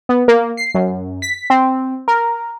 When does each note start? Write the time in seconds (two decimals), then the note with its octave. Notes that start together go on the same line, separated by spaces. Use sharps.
0.09 B3
0.28 A#3
0.57 C7
0.75 F#2
1.22 B6
1.50 C4
2.08 A#4